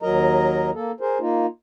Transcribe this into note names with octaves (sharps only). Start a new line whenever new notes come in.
D#2 F#3 A#4 D#5 A#5
A#3 A4
G#4 A#4 C5
A#3 D#4 F4